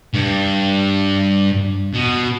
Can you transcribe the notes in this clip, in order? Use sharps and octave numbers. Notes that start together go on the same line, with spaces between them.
G2
B2